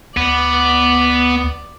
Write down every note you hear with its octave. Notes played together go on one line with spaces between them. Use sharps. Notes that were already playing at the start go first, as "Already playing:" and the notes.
D2 B3 D5